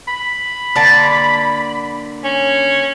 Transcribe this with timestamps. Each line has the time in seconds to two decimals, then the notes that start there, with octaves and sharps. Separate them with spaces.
0.08 B5
0.76 D3 A#3 A5
2.24 C#4